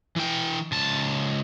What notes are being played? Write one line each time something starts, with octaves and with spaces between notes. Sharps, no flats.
E3 G5
C#2 A5